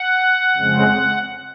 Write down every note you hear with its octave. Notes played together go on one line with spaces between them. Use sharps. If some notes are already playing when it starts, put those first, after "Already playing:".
Already playing: F#5
F2 C#3 G#3 C4